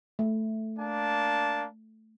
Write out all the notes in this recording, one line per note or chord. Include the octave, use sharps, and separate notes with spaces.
A3
A#3 D4 A5